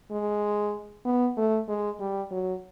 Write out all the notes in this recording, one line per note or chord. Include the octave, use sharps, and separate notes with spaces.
G#3
B3
A3
G#3
G3
F#3